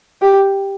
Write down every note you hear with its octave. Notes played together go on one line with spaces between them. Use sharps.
G4